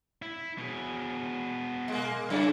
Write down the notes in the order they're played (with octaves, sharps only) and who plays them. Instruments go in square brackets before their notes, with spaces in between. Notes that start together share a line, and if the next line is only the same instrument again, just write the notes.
[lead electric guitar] E4
B2 G#4
[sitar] G#3 A#3
[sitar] F#2 C#3 [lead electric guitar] E4